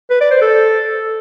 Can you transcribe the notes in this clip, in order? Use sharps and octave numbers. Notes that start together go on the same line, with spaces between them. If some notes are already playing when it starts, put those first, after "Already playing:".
B4
D5
C5
A4